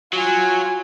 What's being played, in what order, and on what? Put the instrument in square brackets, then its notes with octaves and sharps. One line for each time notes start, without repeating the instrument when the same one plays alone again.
[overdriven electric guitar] F#3 [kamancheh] F4 G#5